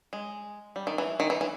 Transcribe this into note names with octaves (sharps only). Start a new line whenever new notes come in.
G#3
G3
D#3
E3
D#3
E3
E3